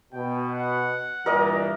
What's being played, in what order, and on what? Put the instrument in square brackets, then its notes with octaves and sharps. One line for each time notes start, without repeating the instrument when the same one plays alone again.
[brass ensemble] B2 [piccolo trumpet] G5
[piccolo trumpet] F#5
[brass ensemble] G2 A#2 E3 [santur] A#4 D5 D#5